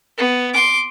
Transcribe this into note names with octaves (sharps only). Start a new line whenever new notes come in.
B3
C6 D6